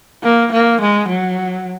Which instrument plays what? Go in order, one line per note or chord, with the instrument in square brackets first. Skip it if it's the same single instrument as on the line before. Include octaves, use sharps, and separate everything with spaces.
[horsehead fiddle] A#3
A#3
G#3
F#3